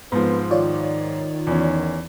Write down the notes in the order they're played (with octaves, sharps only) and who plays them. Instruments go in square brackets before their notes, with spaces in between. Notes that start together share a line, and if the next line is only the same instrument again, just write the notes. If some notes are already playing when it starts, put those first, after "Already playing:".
[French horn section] F2 B4 [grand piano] G#2 F3 [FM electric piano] B3
[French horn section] D#3 [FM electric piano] F4 C#5 D5
[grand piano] E2 C#4